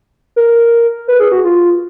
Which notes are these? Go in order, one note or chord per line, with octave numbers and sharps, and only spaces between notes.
A#4
B4
G#4
F#4
F4